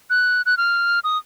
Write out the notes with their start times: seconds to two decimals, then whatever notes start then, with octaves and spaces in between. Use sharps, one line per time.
0.10 F#6
0.46 F#6
0.57 F6
1.04 D#6